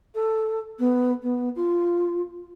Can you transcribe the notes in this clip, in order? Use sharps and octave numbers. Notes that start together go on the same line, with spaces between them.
A4
B3
B3
F4